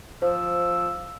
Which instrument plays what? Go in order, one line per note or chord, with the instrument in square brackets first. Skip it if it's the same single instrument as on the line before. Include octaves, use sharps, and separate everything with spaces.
[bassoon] F3 [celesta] C5 [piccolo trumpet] E6